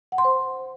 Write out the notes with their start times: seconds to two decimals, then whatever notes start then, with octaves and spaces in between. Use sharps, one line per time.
0.12 F#5
0.18 C6
0.24 C5